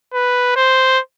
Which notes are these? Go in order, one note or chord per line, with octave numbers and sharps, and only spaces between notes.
B4
C5